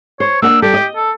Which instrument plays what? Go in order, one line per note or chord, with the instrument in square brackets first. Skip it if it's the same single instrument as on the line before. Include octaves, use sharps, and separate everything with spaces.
[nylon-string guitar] C5 [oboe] C#5
[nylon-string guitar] A#3 D4 F#5 [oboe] E6
[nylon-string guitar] G3 A4 [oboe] G4
[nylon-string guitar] D#5
[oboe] A4